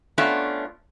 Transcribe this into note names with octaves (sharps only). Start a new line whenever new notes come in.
A3 B3 C#4 D4 F4 E5